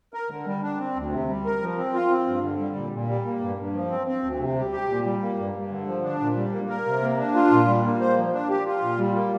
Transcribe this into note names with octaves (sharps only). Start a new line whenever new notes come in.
A#4
D3
G3
D4
C4
D2
C3
G3
A#4
F3
C4
F4
C4
G2
D3
G3
A#2
A#2
G3
A#3
G2
G2
F3
C4
C4
D2
C3
G3
G4
A#2
G3
A#3
G2
G2
D3
F3
D4
A#2
G3
A#3
A#4
C3
A#3
D4
F4
A#2
G3
A#3
C5
F3
D4
G4
F4
A#2
G3
A#3